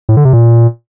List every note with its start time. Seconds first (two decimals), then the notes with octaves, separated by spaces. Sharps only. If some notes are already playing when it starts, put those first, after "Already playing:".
0.09 A2
0.17 D3
0.25 C3
0.33 A#2